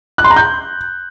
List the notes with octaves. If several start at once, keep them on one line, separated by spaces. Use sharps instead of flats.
F#6
C6
A#5
G6